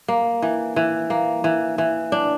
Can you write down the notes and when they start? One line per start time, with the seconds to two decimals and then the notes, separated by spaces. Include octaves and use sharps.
0.08 A#3
0.42 E3
0.76 E3
1.10 A#3
1.44 E3
1.78 E3
2.12 D4